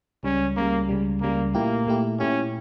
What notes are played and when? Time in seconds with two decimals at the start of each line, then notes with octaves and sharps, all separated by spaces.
0.23 C#2 C#3 G3 C#4
0.56 C#2 C#3 G3 A#3
0.89 C#2 C#3 G3
1.21 C#2 C#3 G3 A#3
1.55 A#2 A3 A#3 E4 G4
1.87 A#2 A3 E4 G4
2.19 A#2 A3 C#4 E4 G4